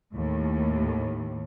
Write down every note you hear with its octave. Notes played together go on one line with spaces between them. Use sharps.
D#2 A2